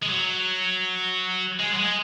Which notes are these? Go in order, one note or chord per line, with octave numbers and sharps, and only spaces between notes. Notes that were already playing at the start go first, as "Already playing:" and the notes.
G#3
F#3
G#3
F#3
G#3